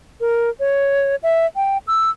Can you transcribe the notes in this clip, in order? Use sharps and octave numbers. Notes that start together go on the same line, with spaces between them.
A#4
C#5
E5
G5
E6